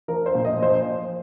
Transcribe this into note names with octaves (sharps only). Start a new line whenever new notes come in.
F3 A#4
C5
A#2
D#5
F3 C5